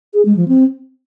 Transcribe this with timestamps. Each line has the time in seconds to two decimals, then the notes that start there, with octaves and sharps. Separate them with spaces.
0.14 G#4
0.25 G#3
0.37 F3
0.48 C4